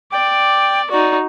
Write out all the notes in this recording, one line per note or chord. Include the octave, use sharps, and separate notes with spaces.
D5 G5
D#4 F#4 D5